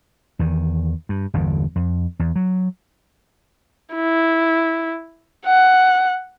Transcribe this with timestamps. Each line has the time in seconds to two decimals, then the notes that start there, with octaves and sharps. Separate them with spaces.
0.39 E2 D#3
1.09 G2
1.34 G1 E2 D3
1.76 F2
2.19 E2
2.36 F#3
3.95 E4
5.45 F#5